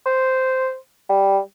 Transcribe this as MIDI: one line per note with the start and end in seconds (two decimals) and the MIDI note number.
0.06 0.75 72
1.09 1.39 55